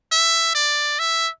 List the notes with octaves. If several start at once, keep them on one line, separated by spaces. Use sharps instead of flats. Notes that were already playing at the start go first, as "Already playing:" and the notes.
E5
D5
E5